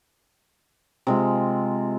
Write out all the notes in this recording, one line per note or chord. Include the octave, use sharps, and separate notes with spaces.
C3 G#3 F4